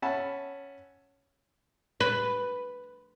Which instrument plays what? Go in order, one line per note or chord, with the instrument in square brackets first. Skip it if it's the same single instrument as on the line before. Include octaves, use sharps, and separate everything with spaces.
[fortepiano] C#4 E5 F#5 A5 B5
[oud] B4